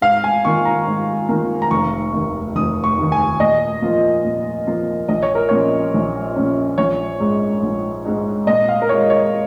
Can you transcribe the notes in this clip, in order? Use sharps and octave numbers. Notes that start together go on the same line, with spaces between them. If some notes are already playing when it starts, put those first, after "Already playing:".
G#2 F5
G#5
D#3 A#3 F4 C#6
A#5
G#2
D#3 A#3 F4
A#5
F1 C#6
D#2 D#3
F1 D#6
C#6
D#2 D#3
G#5
A#2 D#5
F3 A#3 F4
A#2
F3 A#3 F4
A#1 D#5
C#5
A#4
A#2 F3 C#4 C#5
A#1
A#2 F3 C#4
A#1 C#5
G#2 G#3 D#4
A#1
G#2 G#3 D#4
A#2 D#5
F5
A#4
G#3 F4 C#5
C#5